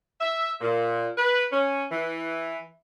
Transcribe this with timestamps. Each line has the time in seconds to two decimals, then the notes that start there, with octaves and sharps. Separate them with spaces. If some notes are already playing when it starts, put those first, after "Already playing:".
0.21 E5
0.61 A#2
1.18 B4
1.52 C#4
1.92 E3